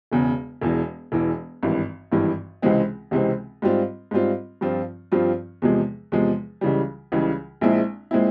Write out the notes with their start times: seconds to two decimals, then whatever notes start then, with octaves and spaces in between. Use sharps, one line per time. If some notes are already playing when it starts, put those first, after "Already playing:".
0.12 E1 E2 C#3
0.61 E1 E2 E3
1.12 E1 E2 E3
1.63 G#1 G2 E3
2.12 G#1 G2 E3
2.62 C#2 C3 E3 G#3 C4
3.11 C#2 C3 E3 G#3 C4
3.62 G#2 G3 C4 F4
4.11 G#2 G3 C4 F4
4.61 G2 F3 C4 F4
5.12 G2 F3 C4 F4
5.62 E2 C3 F3 G#3
6.12 E2 C3 F3 G#3
6.61 C#2 C#3 E3 G3
7.12 C#2 C#3 E3 G3
7.61 A#1 A#2 G#3 C4 E4
8.11 A#2 G#3 C4 E4